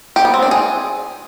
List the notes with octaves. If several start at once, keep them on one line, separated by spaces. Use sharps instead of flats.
G4
B3
C4
D4
G#4